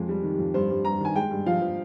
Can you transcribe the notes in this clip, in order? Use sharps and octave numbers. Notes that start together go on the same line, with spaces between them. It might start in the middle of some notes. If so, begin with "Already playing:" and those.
Already playing: F2 G#3
G3
D#3
F2
G2 C5
G2
G2 A#5
D#3 G#5
G#3 G5
G2
F3 F5
F3